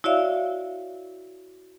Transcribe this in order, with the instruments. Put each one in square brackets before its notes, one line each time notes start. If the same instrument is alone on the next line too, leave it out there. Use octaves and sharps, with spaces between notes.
[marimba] E4 F#4 C#5 D5 E5 F5